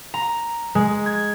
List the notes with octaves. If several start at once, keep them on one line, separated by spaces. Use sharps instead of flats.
A#5
G#3
G#6